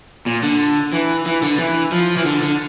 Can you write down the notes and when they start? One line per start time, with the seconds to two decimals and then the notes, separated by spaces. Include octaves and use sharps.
0.26 A#2
0.43 D3
0.93 E3
1.26 E3
1.42 D3
1.59 E3
1.92 F3
2.17 E3
2.25 D3
2.42 D3